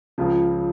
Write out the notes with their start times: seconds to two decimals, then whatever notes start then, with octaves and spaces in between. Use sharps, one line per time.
0.18 C#2 C#3 F3